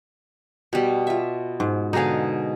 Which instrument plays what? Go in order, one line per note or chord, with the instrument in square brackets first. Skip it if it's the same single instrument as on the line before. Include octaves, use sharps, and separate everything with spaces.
[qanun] B2 G3
F4 E5
[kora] G#2
[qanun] B2 D3 F5 [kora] D#4 G#4